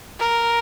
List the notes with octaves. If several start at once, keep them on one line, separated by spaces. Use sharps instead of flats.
A#4